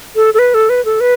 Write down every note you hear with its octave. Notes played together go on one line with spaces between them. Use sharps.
A4
A4
B4
A4
B4
A4
B4